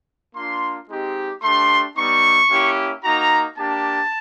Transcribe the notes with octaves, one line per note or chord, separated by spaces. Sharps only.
A#3 D4 F4 C6
G#3 C4 D#4 G4
A3 D4 G4 C6
G3 B3 D#4 C#6
A#3 C#4 E4 G4
A#3 D#4 F#4 A#5
A#3 D4 G4 A5